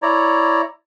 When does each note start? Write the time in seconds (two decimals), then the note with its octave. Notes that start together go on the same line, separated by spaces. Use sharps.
0.02 E4 C#5 D5 A#5